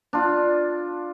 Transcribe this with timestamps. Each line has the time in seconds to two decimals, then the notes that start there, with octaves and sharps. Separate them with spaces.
0.13 D4 F4